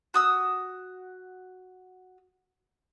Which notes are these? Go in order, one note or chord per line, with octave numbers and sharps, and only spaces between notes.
F#4 D#6 E6